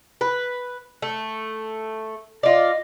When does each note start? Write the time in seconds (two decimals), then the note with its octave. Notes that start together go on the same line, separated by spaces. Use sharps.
0.21 B4
1.02 A3
2.43 F4 D5 D#5